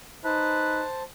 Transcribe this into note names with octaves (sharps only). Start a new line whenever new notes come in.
D#4 B4 C5 A5